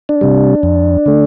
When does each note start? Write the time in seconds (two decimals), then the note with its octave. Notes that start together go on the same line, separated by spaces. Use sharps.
0.09 D4
0.21 C3 G3
0.63 F2
1.06 D3 A3